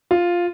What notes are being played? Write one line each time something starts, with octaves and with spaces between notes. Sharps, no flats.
F4